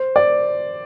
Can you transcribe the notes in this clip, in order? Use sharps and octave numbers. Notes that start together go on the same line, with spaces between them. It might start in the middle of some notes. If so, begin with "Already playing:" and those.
Already playing: C5
D5